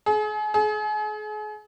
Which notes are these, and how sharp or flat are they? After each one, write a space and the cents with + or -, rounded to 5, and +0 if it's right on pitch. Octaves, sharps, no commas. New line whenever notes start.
G#4 +40
G#4 +40